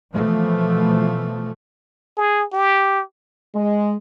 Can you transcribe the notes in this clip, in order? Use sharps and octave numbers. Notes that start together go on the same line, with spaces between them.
B2 E3 F3 A3
G#4
G4
G#3